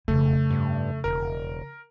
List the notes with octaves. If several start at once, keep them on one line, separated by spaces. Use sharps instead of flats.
E1 F2 C#3 A3
G2
E1 A#4